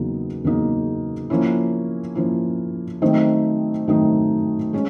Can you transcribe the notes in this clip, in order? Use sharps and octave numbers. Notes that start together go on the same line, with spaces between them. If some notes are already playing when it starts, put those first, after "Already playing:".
Already playing: E2 C#3 F#3 A#3 D#4
E2 C#3 F#3 A#3 D#4
F3 A#3 C#4 E4
F3 A#3 C#4 E4
D#3 F#3 A3 C4 D#4
D#3 F#3 A3 C4 D#4
G#3 C#4